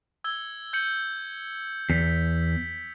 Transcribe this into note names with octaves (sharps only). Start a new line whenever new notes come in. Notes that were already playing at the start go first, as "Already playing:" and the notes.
E6 G#6 G7
G6 C#7 F#7
E2 B6 C#7 F7